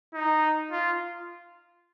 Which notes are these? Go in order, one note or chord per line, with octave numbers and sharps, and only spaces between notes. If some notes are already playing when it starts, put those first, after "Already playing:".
D#4
F4